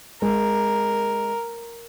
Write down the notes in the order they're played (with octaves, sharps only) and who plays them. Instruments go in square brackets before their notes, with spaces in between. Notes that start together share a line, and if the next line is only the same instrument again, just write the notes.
[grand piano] G#3 [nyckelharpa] A#4